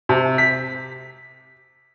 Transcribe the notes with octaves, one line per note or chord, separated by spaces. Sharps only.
C3
B6